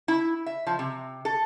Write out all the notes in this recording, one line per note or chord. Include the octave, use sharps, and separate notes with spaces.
E4
E5
F3
C3
A4